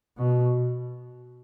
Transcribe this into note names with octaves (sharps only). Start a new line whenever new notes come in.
B2